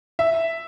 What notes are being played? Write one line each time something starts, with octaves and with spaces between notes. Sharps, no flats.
E5